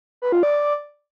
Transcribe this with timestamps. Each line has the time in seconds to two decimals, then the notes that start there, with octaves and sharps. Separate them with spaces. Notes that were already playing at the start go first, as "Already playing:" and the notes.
0.22 B4
0.32 F4
0.43 D5